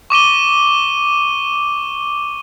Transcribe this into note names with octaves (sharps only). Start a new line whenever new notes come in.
C#6 D6 D#7 G7